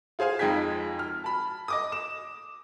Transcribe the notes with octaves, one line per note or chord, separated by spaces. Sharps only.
F4 G#4 C5 F5 G#5
F2 G#3 D#4 G5 G#6 B6
F6
A5 B5
D#5 D6 D#6
D6 E7